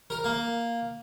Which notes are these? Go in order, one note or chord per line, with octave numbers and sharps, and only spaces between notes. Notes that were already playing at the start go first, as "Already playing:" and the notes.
A#4
A#3